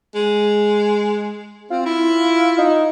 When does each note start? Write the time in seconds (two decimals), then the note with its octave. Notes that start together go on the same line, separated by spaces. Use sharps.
0.15 G#3
1.71 C4 F4
1.86 E4
2.58 D#4